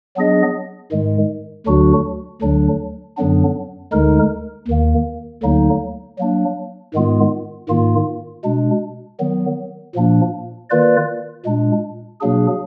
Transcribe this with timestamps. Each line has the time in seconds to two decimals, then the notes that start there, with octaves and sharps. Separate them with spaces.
0.16 F#3 B3 D4 G#4 D#5
0.92 G#2 D#3 G#3
1.67 D2 D3 F#3 D4 F#4
2.42 D2 D3 F#3 D4
3.17 F#2 D3 F#3 B3 D4
3.92 D2 D3 G#3 D#4 A#4
4.68 D#2 D#3 A#3
5.43 D2 D3 F#3 A#3 D#4
6.18 F#3 A#3 D4
6.94 G#2 D#3 G#3 B3 F4
7.69 G#2 D#3 A#3 F4
8.44 B2 G#3 D4
9.20 D#3 F#3 B3
9.95 A#2 F3 A#3 D4
10.70 D#3 A#3 F4 B4 D5
11.45 A#2 G#3 D4
12.21 B2 F#3 A#3 D4 G#4